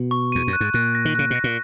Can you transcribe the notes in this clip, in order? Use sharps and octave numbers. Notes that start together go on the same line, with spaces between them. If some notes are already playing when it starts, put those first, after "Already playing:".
Already playing: B2
C#6
E2 D#7
F#2
F#6
G#2
A#2 F#6
A#6
D#3
C#3 F#6
B2
A#6
A#2